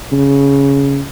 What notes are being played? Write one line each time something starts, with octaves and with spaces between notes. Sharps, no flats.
C#3